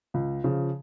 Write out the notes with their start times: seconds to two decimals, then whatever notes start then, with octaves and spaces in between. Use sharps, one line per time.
0.14 C#2
0.44 C#3 F3